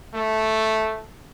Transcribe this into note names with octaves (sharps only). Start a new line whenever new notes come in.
A3